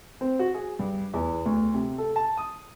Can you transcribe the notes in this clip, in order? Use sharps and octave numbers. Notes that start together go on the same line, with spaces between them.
C4
F#4
G#4
G2
E2
D2
C3
A4
A5
D#6